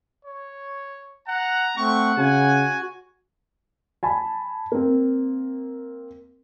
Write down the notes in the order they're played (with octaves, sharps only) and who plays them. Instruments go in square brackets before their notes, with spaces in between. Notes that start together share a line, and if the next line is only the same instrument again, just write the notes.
[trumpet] C#5
[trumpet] F#5 [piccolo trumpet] A#5
[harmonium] A3 C4 [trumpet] F#5 [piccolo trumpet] C#6
[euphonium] C#3 [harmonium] F#4 [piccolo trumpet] G#5
[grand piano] G#5 A5 B5
A#3 C4